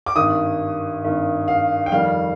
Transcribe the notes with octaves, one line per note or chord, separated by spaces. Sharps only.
D6
G#1 G2 D#3 D#6
G#1 G2 D#3
F5
G5
F2 D#3 G3 F5